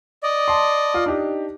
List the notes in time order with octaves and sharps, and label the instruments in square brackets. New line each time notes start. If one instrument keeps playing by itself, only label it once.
[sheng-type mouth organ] D5 D#5
[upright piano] A5 C6
F4
D4 D#4 G4